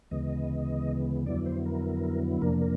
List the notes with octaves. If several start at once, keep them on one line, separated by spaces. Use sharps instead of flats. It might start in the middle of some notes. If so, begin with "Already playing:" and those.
D2 C#3 E3 G#3 B3 D#5
F2 D3 F#3 B3 E4 D5
C5
A#4
F2 C3 F3 A#3 D4 A#4
A#4